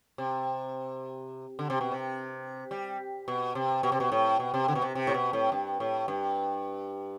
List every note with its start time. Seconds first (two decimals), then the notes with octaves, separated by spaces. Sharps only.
0.18 C3
1.59 D3
1.70 C3
1.81 B2
1.92 C3
2.71 G3
3.28 B2
3.55 C3
3.83 B2
3.92 C3
4.00 B2
4.12 A2
4.40 B2
4.54 C3
4.68 D3
4.75 B2
4.82 C3
4.95 C3
5.07 A2
5.14 B2
5.33 A2
5.52 G2
5.80 A2
6.08 G2